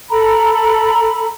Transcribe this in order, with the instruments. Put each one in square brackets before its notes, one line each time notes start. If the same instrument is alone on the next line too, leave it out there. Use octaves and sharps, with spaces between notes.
[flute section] A4 A#5 B5